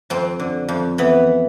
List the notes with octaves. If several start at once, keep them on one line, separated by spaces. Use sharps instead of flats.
F2 C4
D3
F2
E3 B3